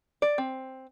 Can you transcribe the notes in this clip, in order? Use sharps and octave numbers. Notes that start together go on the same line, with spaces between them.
D5
C4